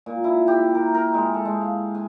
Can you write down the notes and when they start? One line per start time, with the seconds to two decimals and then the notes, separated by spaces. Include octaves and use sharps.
0.06 A#2
0.24 E4
0.48 G4
0.75 A#4
0.94 A#4
1.14 G#3
1.34 A4
1.45 G#3
1.61 F5
1.95 G#5